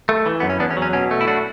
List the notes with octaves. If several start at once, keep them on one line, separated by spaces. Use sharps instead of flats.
A3
E3
F#2 B3
C#4
E2 B3 D4
C#4
F#3
C#4
B2 C#4
A3
E4
D4 F#4